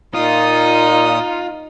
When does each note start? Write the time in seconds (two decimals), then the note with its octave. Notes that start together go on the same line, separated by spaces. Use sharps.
0.14 A#2 D#4 F4 D#6